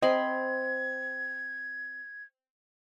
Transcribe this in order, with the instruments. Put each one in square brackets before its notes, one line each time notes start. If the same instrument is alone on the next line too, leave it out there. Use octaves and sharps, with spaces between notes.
[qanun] C4 B5 C6 [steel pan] D#5 [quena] G#6